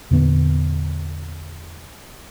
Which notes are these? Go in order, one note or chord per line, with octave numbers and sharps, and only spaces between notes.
E2 A#2 D3 B3